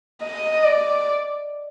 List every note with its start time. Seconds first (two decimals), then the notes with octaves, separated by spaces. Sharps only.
0.23 D#5
0.64 D5